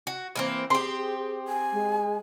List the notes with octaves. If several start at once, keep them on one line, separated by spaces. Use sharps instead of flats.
F#4
E3 A#3 C4
C4 G4 G#4 C6
G#5
G#3